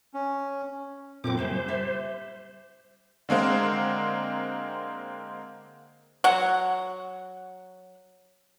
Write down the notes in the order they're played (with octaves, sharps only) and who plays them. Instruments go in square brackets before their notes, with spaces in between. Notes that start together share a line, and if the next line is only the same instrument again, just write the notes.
[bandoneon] C#4
[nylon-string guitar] F2 F#3 A#3 [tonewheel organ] A#2 C4 D6
[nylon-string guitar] F#2 C#3 G3 [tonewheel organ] C5
[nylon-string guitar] G3 D5 E5
[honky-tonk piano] D3 G#3 A#3 C4
[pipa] F#3 F#5